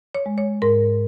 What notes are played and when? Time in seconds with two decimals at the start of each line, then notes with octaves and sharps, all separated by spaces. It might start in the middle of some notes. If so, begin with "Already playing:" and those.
0.15 C#5
0.26 G#3
0.38 C#5
0.62 G#2 A#4